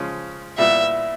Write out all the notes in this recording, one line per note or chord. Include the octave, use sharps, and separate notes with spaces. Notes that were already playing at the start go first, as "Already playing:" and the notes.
Already playing: C#3 F3 G#3 C#4
A#2 G3 B3 E4 E5